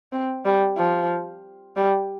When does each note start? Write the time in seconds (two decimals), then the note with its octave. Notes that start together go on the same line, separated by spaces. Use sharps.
0.12 C4
0.45 G3
0.77 F3
1.76 G3